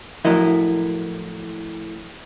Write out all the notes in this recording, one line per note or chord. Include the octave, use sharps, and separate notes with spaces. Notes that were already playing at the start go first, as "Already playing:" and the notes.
A2 F3 F#3 E4 A#4 D#5